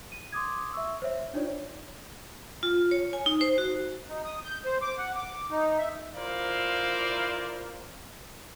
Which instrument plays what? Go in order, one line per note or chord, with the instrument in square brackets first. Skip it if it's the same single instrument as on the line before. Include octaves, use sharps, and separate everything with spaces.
[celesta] D#7
C6 D6 D#6 G#6
E5 C#6 E6
C5 C#5 E5
D4 D#4 F4 C#5 D5
[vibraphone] F4
C#5
G#5
D#4
C5
F#4
[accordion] D#4
D#6
G6
C5
D6
F#5
D6
D#4
E5
[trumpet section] E4 F4 A#4 C5 D5 F5